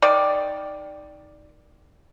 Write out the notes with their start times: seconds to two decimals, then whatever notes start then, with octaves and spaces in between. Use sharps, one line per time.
0.02 D#3 D5